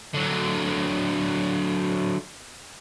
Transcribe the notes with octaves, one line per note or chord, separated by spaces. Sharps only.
D3 F#3